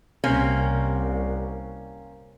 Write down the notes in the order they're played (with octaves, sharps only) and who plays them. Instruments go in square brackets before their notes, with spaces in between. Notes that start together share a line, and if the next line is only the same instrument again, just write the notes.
[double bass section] C2 [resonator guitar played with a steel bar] A#3 C4 C#4